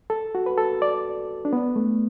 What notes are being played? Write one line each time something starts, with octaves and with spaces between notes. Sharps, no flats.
A4
F#4
B4
A4
D5
D4
B3
A3